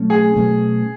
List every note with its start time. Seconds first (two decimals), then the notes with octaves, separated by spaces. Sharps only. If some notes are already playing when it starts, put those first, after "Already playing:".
Already playing: B2 F#3 A3 C#4
0.10 G#4
0.36 B2 F#3 A3 C#4